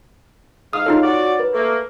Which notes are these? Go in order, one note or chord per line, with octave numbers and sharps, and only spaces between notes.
G#2 F5 D#6
D#4 F4 A4 C#5
F#4 D5
A#4 B4
A3 A#3